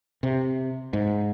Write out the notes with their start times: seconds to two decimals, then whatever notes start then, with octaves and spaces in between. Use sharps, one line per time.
0.23 C3
0.93 G#2